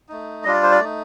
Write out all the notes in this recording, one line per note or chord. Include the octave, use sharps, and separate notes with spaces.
A3 D#4
G3 D4 F4 D#5
D5
C5
D5
A3 D#4